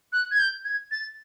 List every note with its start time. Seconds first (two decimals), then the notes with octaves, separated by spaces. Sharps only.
0.12 F#6
0.31 G#6
0.39 G6
0.65 G#6
0.91 A6